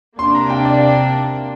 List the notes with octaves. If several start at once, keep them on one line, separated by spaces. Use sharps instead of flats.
C3 A#3 D4 C6
A#5
G5
D5
G5